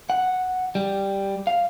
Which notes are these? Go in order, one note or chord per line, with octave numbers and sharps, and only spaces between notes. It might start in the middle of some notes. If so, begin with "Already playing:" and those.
F#5
G3
F5